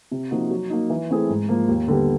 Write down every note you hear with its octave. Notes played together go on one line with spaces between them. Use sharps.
C3
F3 A#3 D#4 F#4
F#3
A#3 D#4
E3
A3 C4 E4 G#4
G#2
F3 A#3
D#2
D3 G3 B3